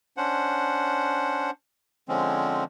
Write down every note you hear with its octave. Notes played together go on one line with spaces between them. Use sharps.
C#4 D4 C5 F#5
D3 F3 G#3 C4 C#4